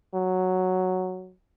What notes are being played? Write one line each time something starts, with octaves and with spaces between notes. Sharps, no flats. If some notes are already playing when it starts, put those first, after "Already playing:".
F#3